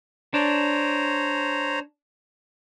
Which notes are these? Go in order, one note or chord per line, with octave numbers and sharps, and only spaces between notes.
D4 C5 C#5 A#5